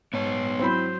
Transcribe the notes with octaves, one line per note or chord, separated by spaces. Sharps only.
G#2 B3 C#5
F#3 C4 E4 C5 B5